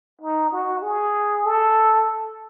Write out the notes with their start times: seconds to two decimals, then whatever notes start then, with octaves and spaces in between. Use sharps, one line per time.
0.22 D#4
0.52 F#4
0.82 G#4
1.46 A4